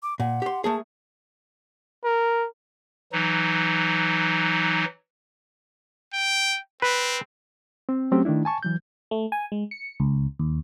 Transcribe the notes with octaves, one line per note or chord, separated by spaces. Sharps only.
D6
A#2 F#5
G4 C6
A3 A#3 G#4 A5
A#4
E3 F#3 D#4
G5
C4 B4
C4
F#3 A3 C4 C#4 G4
D#3 A3 D4 E4
G#5 A5 C#6
E3 F#3 G6
A3
G#5
G#3
C#7
C#2
D#2